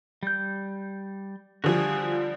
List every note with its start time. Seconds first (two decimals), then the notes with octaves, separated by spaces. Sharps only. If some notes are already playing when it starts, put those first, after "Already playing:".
0.23 G3 G6
1.64 D3 F3 G3 F#4 G#4